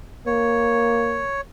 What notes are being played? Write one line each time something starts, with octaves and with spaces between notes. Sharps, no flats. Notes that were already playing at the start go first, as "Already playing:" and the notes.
A#3 C#5